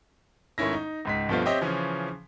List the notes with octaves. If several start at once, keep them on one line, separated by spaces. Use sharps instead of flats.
G#2 D#3 A3 C#4 E4 A#6
D#4
C#2 G#2 B6
G2 B2 F3 A3 B3 F4
C4 G4 C#5 D#5 E5
C#3 E3 F3 C#4